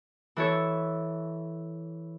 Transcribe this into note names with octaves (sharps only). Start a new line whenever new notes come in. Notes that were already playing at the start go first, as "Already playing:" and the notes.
E3 A4 C#5